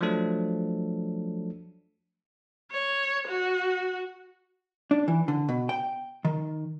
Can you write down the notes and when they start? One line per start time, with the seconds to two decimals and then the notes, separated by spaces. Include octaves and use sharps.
0.01 F3 F#3 A3 D4 A4
2.71 C#5
3.27 F#4
4.91 D4
5.08 E3
5.28 D3
5.49 B2
5.69 G5
6.25 D#3